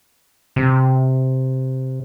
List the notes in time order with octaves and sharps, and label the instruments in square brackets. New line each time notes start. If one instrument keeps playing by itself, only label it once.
[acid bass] C3